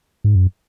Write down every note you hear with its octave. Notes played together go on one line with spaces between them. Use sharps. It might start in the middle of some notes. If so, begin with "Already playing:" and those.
G#2
F#2